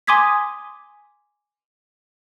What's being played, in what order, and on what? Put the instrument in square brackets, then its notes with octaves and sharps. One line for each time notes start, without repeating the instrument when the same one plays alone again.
[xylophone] G#5 C6 D6 D#6 G#6 B6